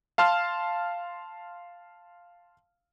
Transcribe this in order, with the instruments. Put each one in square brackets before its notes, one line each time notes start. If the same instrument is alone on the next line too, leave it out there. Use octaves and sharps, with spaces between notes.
[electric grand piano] F5 A5 C6 F6